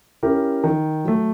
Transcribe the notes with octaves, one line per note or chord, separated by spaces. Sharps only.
C#4 E4 G4 A#4
D#3
F#3 A3